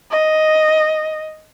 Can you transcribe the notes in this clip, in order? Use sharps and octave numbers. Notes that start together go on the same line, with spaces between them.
D#5